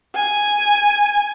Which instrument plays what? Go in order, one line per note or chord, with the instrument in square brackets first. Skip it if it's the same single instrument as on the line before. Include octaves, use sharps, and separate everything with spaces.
[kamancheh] G#5